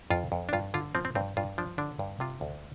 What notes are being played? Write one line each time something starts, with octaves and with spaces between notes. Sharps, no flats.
F2 F4
F2
D4
G2 F4
D3 F4
F3 C4
C4
G2 C4
G2 F4
F3 D4
D3 D4
G2
C3 F4
D2